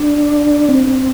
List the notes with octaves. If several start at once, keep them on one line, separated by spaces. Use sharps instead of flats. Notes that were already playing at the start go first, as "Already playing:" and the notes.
Already playing: D4
C4